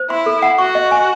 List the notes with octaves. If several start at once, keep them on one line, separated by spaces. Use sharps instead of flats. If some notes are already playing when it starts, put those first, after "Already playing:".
Already playing: C5
E4 C6
A4
F#5
F#4 C#6
D#5
G#5